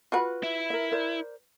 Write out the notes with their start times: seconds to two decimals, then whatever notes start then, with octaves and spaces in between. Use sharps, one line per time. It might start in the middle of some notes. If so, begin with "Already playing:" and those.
0.12 F4 F#4 B4
0.43 E4
0.70 A#4 E5
0.92 A#4 C5 D5